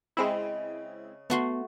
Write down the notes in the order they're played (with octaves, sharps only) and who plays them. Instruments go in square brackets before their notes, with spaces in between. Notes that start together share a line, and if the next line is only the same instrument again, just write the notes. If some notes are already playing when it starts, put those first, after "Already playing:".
[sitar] C#3 D#5 [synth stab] G#3 C4 E4
[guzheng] A3 F#4 C6 [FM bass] B3